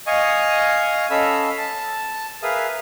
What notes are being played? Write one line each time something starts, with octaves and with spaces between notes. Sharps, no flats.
D#5 F5 G#5 C#6 D#6
C#4 A4 D#5 F5 B5 E6
A5
G#4 A#4 B4 E5 F5 D#6